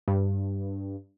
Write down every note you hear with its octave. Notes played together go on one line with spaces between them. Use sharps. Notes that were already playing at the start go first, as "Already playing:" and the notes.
G2